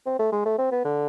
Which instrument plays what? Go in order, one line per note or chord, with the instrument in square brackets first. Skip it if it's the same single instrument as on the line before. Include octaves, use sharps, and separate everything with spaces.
[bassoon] C4
A3
G#3
A3
C4
B3
D3